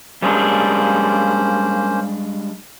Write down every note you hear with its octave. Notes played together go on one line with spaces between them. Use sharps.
G3 G#3 A#3 C#4 D4 C5